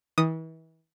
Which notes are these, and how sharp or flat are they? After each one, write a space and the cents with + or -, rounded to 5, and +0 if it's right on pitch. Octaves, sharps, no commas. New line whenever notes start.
E3 -35 D#6 +0